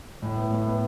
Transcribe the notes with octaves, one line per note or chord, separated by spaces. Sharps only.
A2
B3
A2
B3